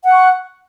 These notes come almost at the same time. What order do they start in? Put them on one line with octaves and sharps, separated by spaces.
F#5 F#6 C#6